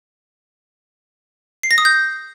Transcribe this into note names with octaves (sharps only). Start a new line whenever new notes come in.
C7
A#6
D#6
G6